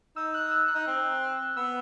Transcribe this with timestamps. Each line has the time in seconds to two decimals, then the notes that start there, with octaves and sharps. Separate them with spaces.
0.16 D#4 E6
0.34 F#6
0.51 E6
0.68 F#6
0.75 D#4
0.87 C4
1.57 B3 E6